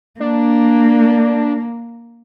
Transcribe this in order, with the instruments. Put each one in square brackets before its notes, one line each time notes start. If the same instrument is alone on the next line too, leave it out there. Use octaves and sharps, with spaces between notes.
[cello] A#3 [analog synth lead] D4